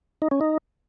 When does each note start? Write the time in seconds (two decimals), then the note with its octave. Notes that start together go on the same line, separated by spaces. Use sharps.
0.22 D#4
0.31 C#4
0.41 D#4